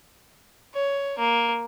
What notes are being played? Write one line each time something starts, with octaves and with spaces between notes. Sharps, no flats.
C#5
A#3